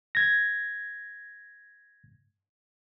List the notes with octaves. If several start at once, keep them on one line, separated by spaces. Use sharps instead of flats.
G#6 A#6